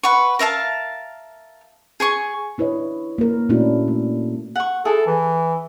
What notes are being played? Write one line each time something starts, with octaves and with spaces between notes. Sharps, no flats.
B4 F#5 C#6
A#4 E5 F5 A5
G#4 G#5 C#6
D4 E4 B4 C#5 D#5
A#3 A#4
A#2 A3 C#4 D4 E4 F#4
A3
F#5 C#6
E4 G#4 A4
E3